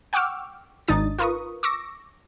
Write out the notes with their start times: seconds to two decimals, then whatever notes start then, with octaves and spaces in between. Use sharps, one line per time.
0.13 F#5 G5 C#6 D6 E6 F6
0.88 G#1 D4 D#4 D#6 A6
1.19 F4 A#4 B4 C#6 D#6
1.63 C#6 D6 E6 A#6